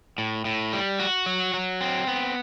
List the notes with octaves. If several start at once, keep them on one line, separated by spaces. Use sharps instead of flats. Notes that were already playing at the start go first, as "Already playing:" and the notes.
A2
A2
G3
F#4
F#3
F#3
C4
B3